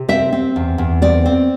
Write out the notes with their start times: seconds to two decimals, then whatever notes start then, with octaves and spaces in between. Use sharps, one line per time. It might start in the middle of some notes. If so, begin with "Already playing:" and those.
Already playing: C3
0.09 C4 E5
0.33 C4
0.56 E2
0.78 E2
1.02 C4 D5
1.26 C4